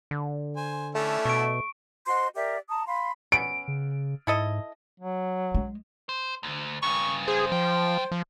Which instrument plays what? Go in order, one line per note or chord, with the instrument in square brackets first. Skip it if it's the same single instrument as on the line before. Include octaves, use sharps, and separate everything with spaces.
[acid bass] D3
[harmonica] C5 G#5
[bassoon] A3 [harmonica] C#4 D4 E4
[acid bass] B2 [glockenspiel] C#6 D7
[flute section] F#4 C5 D#5 C6
G4 A#4 D5 E5
A5 A#5 D#6
F5 B5 C6
[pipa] B3 C#4 [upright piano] D7
[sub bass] C#3
[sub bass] G#2 [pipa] E4 A4 D#5
[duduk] F#3
[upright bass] G#3
[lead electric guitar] C5
D2
[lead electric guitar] G2 C#3 [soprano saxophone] C#6
[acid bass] G#4 [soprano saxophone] C5
[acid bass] F3 [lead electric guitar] F#3 G5
[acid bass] F3